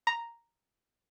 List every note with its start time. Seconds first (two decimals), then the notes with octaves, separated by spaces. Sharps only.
0.07 A#5